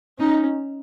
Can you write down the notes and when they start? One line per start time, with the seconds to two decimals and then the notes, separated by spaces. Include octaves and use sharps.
0.19 C#4 D#4